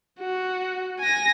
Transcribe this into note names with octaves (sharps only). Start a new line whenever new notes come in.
F#4
G#5 A#6